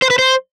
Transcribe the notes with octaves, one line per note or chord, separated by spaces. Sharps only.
C5
B4
C5